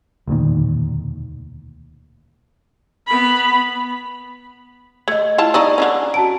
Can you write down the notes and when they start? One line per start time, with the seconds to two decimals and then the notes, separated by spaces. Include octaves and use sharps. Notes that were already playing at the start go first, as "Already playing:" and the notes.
0.27 E1 D2 A#2 D#3
3.07 B3 B5
5.08 A3 D#5 G#6
5.38 E4 F4 A5
5.54 D#4 D5 D#5 A#5 C#6 E6
5.78 D3 D#3 C#4
6.14 F#4 A5 D7